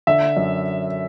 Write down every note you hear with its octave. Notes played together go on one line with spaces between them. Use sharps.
D3 E5
F#2